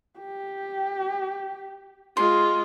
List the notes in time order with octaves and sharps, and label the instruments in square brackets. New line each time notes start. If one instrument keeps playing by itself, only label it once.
[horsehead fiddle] G4
[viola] G#3 F4 [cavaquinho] C6